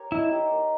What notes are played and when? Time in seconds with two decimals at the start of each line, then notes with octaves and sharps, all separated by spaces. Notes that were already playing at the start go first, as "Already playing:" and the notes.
Already playing: G4 A#4 C#5
0.12 D#4 E4
0.32 G4
0.51 A#4